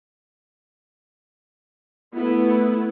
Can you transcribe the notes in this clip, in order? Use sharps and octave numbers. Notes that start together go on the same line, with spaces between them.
A3 B3 E4